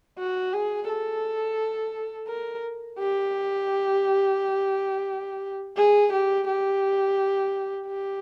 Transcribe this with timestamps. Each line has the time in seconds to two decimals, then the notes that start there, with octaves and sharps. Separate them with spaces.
0.18 F#4
0.53 G#4
0.89 A4
2.27 A#4
2.99 G4
5.77 G#4
6.12 G4
6.48 G4
7.87 G4